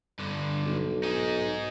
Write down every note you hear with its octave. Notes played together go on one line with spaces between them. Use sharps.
G2 D3
B1
D#4 G#4